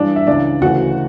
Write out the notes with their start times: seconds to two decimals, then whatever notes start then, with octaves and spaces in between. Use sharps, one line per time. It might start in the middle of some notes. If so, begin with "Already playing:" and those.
Already playing: G2 E3 D4 D5
0.16 E5
0.27 C#2 C#3 E3 D4 D5
0.61 D2 C#3 E3 F#4 F#5